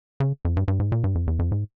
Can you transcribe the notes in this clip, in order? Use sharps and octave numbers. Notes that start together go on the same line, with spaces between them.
C#3
F2
G2
G2
G#2
A#2
G2
F2
E2
F2
G#2